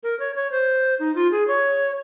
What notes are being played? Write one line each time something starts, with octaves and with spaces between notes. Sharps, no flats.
A#4
C#5
C#5
C5
D#4
F4
G#4
C#5